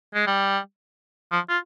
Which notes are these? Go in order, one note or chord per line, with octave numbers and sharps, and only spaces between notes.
G#3
G3
F3
F4